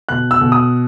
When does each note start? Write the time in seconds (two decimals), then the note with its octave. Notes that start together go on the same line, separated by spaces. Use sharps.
0.09 B2 F#6
0.31 E6
0.41 B2
0.52 D#6